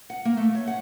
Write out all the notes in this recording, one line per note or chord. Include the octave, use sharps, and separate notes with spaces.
F#5
A#3
A3
C#5
F#5